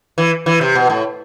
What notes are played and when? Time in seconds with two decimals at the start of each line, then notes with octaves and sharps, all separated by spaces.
0.18 E3
0.46 E3
0.61 C3
0.75 B2
0.90 A2